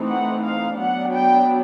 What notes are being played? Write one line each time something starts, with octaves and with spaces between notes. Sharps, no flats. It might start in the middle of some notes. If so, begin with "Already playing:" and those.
Already playing: E3 A3 C4 D#4
F#5
F5
F#3 B3 D4 F#5
G5